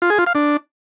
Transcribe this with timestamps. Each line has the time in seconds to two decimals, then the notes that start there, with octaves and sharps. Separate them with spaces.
0.02 F4
0.10 G#4
0.18 F4
0.27 F5
0.35 D4